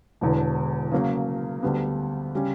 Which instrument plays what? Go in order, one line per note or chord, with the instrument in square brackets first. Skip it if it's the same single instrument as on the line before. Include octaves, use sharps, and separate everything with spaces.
[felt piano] E1 E2 D3
C#3 F#3 A#3
D2 D3 G3 B3
C#3 G3 C#4